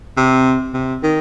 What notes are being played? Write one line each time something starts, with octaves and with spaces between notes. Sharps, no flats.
C3
C3
D#3